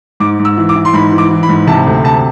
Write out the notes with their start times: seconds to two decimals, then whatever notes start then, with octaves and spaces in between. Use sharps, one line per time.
0.20 G#2 D6
0.39 G#2
0.45 E6
0.57 E3
0.69 D6
0.75 E3
0.85 C6
0.94 G#2 B5
1.12 E3
1.18 D6
1.31 E3
1.43 B5
1.49 G#2
1.67 C3 A5
1.86 D2
2.04 C3 A5